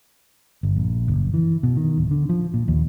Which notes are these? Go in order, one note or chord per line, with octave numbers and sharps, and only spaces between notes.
G1
A#1
F#1
E3
B2
D#3
D1
D3
F3
A#2
D#2